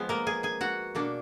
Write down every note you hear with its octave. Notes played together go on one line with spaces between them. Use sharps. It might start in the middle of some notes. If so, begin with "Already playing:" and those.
Already playing: F3 G#3 B3
A#3 A#4
G#4 G#5
G#4 G#5
F#4 F#5
B2 A#3 D4